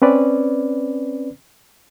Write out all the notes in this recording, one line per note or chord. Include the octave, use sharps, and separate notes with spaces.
C4 C#4 B4 D5